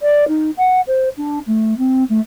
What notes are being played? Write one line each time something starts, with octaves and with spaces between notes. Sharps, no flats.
D5
D#4
F#5
C5
D4
A3
C4
A3